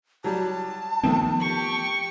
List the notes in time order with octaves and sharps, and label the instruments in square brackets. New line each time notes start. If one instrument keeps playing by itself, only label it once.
[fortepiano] F#3 G3 [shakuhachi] A5
[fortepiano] D#3 A3 [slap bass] F3 B3 C4
[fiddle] G4 C#6